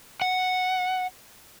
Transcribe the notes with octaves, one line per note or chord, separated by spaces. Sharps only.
F#5